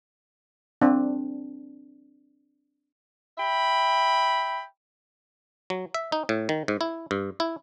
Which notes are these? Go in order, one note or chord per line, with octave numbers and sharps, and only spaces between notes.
C4 D4
E5 G5 B5
F#3
E5
D#4
A2
D#3
G#2
E4
G2
E4